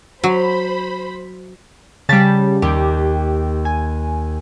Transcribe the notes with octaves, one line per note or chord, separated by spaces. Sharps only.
F#3 C5 B5
C#3 G3 A5 A6 B6
D#2 G4
G#5